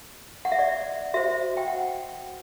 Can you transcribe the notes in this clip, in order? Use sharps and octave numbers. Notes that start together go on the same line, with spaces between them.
F#5
E5
D5
F#4 C5 E5
G5
F#5